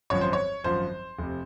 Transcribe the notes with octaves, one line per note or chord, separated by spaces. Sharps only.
G#1 F#2 F3 C#5
C5
C#5
G#1 F#2 F3 C5
F1 C3